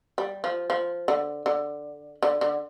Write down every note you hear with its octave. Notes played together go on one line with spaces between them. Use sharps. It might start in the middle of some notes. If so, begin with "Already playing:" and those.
G3
F3
F3
D3
D3
D3
D3